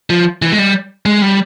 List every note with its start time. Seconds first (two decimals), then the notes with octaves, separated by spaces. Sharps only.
0.10 F3
0.42 E3
0.52 G#3
0.58 G3
1.06 G#3
1.22 G3